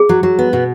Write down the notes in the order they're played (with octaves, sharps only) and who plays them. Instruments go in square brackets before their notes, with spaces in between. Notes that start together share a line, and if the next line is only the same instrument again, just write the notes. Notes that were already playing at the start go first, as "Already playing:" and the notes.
Already playing: [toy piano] G#4
[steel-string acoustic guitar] F#3
F#3
B3
B2